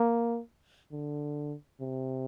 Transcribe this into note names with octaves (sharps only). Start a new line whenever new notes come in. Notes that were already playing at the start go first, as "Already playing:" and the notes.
Already playing: A#3
D3
C3